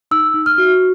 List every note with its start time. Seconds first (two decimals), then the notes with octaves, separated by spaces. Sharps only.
0.11 D#4 E6
0.34 D#4
0.46 F6
0.58 F#4